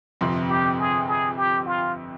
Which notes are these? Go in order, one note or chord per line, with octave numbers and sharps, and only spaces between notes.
G1 F2 C3 F3 C4
G4
G#4
G#4
G4
F4